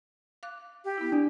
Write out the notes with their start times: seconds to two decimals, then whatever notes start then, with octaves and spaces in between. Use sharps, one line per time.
0.43 F5 D6 F#6
0.85 G4
0.98 B3 E4
1.12 D4